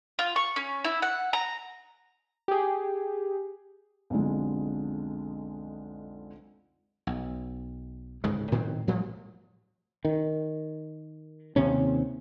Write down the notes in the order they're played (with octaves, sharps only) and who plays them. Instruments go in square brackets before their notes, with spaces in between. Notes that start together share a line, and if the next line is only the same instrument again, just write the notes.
[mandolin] F4
C#6
C#4
E4
F#5
A#5
[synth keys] G4 G#4
[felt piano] B1 F2 D3 G#3
[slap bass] B1
D1 G#2 C#3 G#3
A2 D#3 F#3 C4
A2 F3 G3 A3
[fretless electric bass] D#3
D#2 C3 C#4